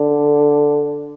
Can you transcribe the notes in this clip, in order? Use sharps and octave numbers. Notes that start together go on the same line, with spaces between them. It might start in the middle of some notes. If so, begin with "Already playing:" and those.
Already playing: D3